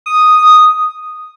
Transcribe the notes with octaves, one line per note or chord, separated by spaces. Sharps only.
D#6